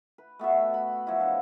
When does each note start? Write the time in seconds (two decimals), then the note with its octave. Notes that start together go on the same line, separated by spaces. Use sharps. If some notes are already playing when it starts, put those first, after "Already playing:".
0.18 B4
0.39 A3 B3 F#4 E5
0.74 B5
1.07 F3 F#3 E4
1.20 D3 F3